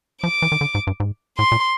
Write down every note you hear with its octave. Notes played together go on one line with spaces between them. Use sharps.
F3 D6
E3
D#3
D3
G#2
G2
G#2
A2 C6
A#2